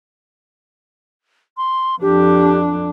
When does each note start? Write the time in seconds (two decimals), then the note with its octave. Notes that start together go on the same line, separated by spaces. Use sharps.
1.57 C6
2.02 F2 D4 G4